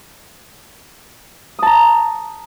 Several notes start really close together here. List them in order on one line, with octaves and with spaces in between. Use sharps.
D#6 A5 A#5